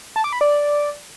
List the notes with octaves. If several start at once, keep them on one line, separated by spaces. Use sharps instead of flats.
A5
D6
B5
D5